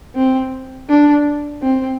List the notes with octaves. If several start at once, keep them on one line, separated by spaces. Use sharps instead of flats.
C4
D4
C4